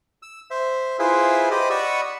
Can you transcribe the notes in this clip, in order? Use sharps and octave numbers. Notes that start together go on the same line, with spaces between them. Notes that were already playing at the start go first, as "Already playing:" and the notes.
E6
C5 E5
E4 F4 G#4 B4 C5 E5
G4 C5 D#5 B5 D6
D5 D#5 F#5 B5 C#6 E6